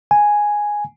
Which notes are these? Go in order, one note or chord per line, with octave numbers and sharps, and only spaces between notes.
G#5